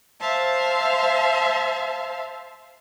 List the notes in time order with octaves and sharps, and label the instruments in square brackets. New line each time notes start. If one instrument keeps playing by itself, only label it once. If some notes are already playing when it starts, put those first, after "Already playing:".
[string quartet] C5 E5 F5 A5